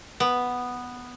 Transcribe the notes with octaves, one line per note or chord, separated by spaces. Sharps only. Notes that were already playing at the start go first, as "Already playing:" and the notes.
B3